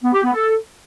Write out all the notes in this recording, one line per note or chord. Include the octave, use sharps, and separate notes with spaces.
B3
G4
B3
A4